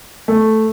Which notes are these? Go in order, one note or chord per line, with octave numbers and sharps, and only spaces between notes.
A3